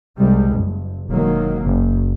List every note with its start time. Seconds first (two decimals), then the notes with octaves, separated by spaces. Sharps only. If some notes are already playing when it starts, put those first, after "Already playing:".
0.18 C2 G3 G#3
0.56 F#1
1.09 E1 D#3 F#3 A#3
1.65 F#1 F#2